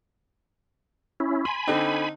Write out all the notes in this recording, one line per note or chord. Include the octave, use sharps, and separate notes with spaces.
C#4 E4
G#5 B5 C6
D3 C4 D#4